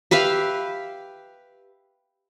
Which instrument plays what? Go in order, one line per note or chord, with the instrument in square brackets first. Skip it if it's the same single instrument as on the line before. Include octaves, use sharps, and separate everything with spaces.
[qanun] G4 B4 E5 F5